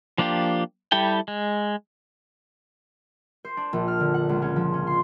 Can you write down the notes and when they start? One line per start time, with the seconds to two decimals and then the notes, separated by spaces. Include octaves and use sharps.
0.18 F3 A#3 D4 F4 G4
0.92 G3 E4 G4 A4 G5
1.28 G#3
3.45 C5
3.57 D4
3.73 A#1
3.88 F6
4.00 D3
4.14 F#5
4.29 C#2
4.42 C#4
4.56 F3
4.74 C#4
4.87 C6